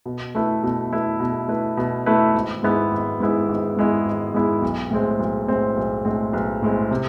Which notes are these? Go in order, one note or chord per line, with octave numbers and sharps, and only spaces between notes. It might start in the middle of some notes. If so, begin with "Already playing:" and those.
B2
A3 E4 B4
B2
A3 E4 B4
B2
A3 E4 B4
B2
A3 E4 B4
G#1
G#2 G#3 B3 E4
G#1
G#2 G#3 B3 E4
G#1
G#2 G#3 B3 E4
G#1
G#2 G#3 B3 E4
B1
A2 G#3 C4
B1
A2 G#3 C4
B1
A2 G#3 C4
B1
A2 G#3 C4
C3